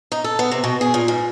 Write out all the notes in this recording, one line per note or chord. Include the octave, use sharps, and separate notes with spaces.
D#4
A4
B3
C3
B2
G#4
A#2
G#2